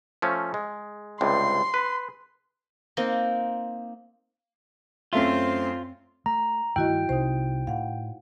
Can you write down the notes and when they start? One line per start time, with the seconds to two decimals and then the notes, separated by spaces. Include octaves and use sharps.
0.22 F3 A3 C#4
0.54 G#3
1.21 C#2 G2 C3 C6
1.74 B4
2.97 A#3 C4 D#4
5.13 F#2 A3 C4 F4 C5 E5
6.26 A3 A#5
6.76 G2 D#3 A3 E4 F#4 D#5 G5
7.09 C2 C3 D#4 C5
7.67 A2 F5 F#5